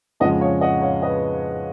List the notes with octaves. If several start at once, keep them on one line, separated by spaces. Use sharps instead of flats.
F2 C#3 F3 G#3 D#5 F#5
C#5 F5
D#5 F#5
C#5 F5
B4 D#5